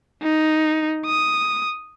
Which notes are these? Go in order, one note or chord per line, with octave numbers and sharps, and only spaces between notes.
D#4
D#6